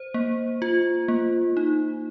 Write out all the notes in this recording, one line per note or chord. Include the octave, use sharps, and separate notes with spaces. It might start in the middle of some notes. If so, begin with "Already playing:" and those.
Already playing: C5
A#3
F4
A#3
D#4